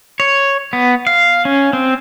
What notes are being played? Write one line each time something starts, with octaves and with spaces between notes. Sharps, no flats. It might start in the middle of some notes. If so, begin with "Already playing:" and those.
C#5
B3
F5
C#4
C4